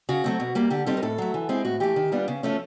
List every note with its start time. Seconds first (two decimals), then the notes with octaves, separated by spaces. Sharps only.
0.09 C#3 F#4
0.24 F#3 A3 C4
0.40 B2
0.55 G3 A#3
0.70 D3 G4
0.86 G3 C4 D#4 A4
0.97 A#4
1.03 A2 A4
1.18 F#3 A3
1.34 E3
1.49 G#3 C4 E4
1.65 A2 F#4
1.80 E3 A3 G4
1.96 D#3
2.12 G3 B3 D4 F4
2.28 C#3
2.43 F3 A3 C#4